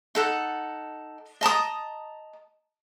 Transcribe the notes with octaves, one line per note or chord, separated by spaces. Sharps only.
D#4 A4 F#5
D#5 A5 A#5 D#6